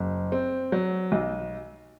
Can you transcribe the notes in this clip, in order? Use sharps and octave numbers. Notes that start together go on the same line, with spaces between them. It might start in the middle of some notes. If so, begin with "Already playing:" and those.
Already playing: F#1
C4
F#3
B1